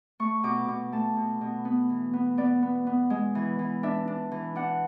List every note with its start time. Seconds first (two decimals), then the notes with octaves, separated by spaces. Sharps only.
0.20 A3 C#6
0.43 B2 D6
0.68 B2 D6
0.92 A3 A5
1.17 B2
1.41 B2
1.65 B3
1.90 E3
2.13 B3
2.37 B3 D5
2.62 B3
2.87 B3
3.10 G#3
3.35 E3
3.59 E3
3.83 D4 E5
4.08 D4
4.32 E3
4.56 D4 F#5